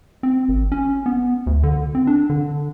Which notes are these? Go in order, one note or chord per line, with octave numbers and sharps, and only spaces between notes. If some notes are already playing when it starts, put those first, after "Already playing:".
C4
G#1
C#4
B3
D2
D3
C4
D4
D3